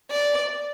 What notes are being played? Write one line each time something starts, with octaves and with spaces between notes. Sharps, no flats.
D5